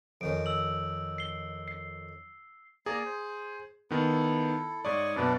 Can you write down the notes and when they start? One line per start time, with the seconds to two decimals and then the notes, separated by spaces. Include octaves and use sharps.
0.21 F2 D#3 C#4 D7
0.46 E6 F#7
1.18 C7 G7
1.68 C7
2.86 A#3 G#4 D5 A#5
3.06 C5
3.91 D#3 B3 E4 A4
4.85 G#2 C#5 D5 C#6 D#6
5.16 F#2 B2 D4 B4 D5